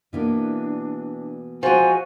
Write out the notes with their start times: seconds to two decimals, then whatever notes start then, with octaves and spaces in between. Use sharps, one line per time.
0.13 B2 E3 A#3 D4
1.63 F3 G#3 F#4 G#5